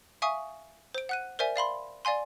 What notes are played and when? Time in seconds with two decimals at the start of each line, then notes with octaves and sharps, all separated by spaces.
0.22 E5 F5 G#5 C#6 D#6
0.95 C5 D7
1.09 F#5 F#6 D#7
1.39 A#4 C5 D5 E5 G#5
1.56 D5 F5 B5 C6
2.05 D5 F5 G#5 C6